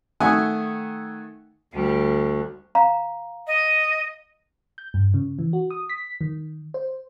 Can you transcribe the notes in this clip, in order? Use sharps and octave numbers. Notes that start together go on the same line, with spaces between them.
D#3 A3 E5 F#5 G#5 D#6
D2 G3
F5 A#5
D#5
G6
G2
C#3
E3
F#4
D#6
B6
D#3
C5